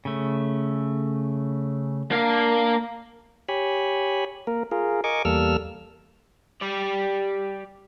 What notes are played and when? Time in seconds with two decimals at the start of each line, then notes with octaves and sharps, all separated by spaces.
0.05 C#3 A3
2.11 A#3 D4 F5
3.49 G4 C#5 G#5 B5
4.47 A#3 A#4
4.71 F4 G#4 A#4
5.04 A#4 D#5 G#5 C#6 D6
5.25 E2 G3 A#3 A4 E6 F6
6.61 G4 D5